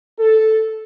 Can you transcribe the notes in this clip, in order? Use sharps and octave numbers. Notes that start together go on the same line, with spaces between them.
A4